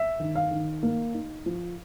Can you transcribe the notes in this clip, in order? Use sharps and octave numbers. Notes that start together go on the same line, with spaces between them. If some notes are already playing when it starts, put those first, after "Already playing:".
Already playing: E5
D#3
F5
D#3
A#3
D#4
F3